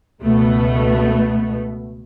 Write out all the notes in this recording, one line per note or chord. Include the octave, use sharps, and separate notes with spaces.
C#2 B2 A3 B3